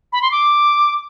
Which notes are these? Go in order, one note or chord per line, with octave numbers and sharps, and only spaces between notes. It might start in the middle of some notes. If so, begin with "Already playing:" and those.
B5
C6
D6